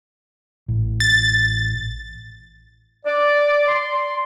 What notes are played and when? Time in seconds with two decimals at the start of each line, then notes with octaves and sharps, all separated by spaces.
0.68 A1
1.00 A6
3.05 D5
3.68 C6